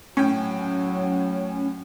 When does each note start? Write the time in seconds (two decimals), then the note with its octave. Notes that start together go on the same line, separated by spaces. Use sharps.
0.17 A2 F#3 C#4 G5